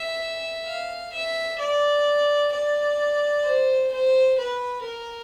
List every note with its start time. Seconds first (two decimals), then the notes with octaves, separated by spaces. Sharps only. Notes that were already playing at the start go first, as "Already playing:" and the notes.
Already playing: E5
0.66 F5
1.12 E5
1.59 D5
2.52 D5
3.45 C5
3.92 C5
4.38 B4
4.84 A#4